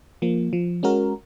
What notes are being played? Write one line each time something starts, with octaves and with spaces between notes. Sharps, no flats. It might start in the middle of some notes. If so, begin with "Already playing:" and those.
F3 A#3
F3
G#3 C#4 F#4 A#4